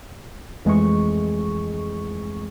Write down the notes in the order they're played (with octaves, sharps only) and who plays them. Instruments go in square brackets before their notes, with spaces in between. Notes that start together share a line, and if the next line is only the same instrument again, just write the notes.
[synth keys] F2 E3 G#3 A3 G#4 C#6